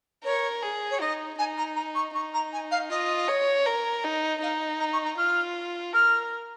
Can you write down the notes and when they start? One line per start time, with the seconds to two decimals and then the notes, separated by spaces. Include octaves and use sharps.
0.24 A#4 C#5
0.62 G#4
0.90 C#5
1.00 D#4 D#5
1.38 D#4 G#5
1.57 A#5
1.76 A#5
1.95 C#6
2.14 D#4 C#6
2.34 A#5
2.52 G#5
2.71 F5
2.90 F4 D#5
3.28 C#5
3.66 A#4
4.04 D#4
4.42 D#4 F5
4.80 A#5
4.93 C#6
5.05 A#5
5.17 F4 F6
5.93 A#4 F6